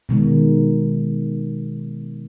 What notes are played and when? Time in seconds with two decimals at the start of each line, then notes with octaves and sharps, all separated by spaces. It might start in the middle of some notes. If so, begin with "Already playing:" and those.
0.09 B2 D#3 G#3